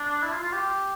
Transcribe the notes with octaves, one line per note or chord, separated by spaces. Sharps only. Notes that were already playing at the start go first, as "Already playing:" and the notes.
Already playing: D4
E4
F4
F4
G4